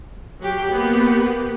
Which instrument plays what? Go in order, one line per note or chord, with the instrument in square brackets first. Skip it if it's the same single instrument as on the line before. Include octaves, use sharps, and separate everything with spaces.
[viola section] F#3 G4
A#3 B3 G4